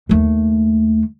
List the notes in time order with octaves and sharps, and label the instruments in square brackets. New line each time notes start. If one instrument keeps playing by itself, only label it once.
[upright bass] D#2 A3